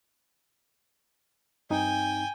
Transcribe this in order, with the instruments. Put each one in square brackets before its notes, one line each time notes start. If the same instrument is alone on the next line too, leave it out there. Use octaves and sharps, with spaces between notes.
[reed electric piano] G2 C4 D#4 [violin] G5 G#5